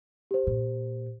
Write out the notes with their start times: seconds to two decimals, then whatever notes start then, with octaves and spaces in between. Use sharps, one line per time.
0.31 G4 C5
0.47 A#2